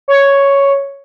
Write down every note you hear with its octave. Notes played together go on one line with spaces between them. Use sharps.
C#5